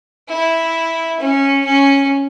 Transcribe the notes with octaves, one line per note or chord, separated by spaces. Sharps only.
E4
C#4
C#4